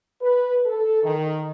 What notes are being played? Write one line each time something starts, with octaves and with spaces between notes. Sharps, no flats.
B4
A4
D#3